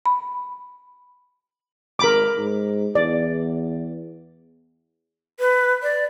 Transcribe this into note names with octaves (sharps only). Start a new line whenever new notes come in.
B5
G#1 A#4 B5 D6
G#2
E2 D5
B4
D5